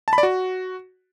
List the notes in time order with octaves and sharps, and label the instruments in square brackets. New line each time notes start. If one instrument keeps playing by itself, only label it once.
[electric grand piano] A5
B5
D5
F#4